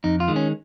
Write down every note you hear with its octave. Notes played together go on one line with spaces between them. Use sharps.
F2 D#4
F4
D#3 G#3
C#4